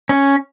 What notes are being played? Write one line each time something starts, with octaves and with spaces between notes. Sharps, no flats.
C#4